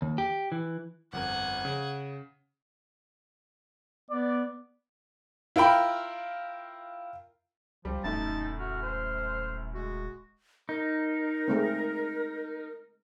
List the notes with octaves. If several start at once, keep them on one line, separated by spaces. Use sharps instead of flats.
D#2
G4
E3
G1 F2 A#4 F#5 G#5
C#3
B3 D5
E4 F4 A#4 G5 B5
C#2 F3 G3
D#1 F#2 A2 D#4 A5
F#4 F6
C5
G#3 F#4
D#4 A#4
G#3 A3 C4